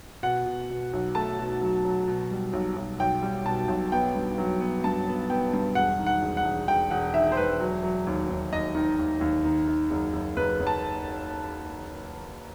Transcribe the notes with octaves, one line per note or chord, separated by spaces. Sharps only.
B2 F#5
B2
B2
B1
A3 A5
B2
F#3
F#3
B2
G3
B1
B1
B1 G5
G3
B2 A5
B1
B3 G5
G2
F#3
B3
G2 A5
B3
B3 G5
G2
E1 F#5
D#3
F#5
E1
F#5
E1
E1 G5
E1 F#5
D#3 E5
C5
E1 B4
F#3
F#3
D#2
D#2
D#2 D#5
D#3
D#2
D#2
D#3
D#3
F#1
F#1
F#1 B4
F#1
A5